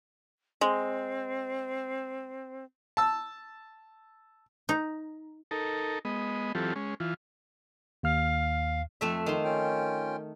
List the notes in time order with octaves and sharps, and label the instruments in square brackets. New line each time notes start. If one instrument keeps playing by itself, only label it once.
[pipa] G#3 [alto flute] C4
[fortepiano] A5 E6
[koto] D#4
[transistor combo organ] D#4 A4 A#4
G#3 B3 D#5
E3 F#3 C4 F4 G4 A4
G#3 C#4
E3 F4
[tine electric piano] D#2 F6 [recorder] F5
[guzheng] F2 A3 E5
[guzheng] D#3 C6 [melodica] G#3 A#3
[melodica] C#4 F4 G5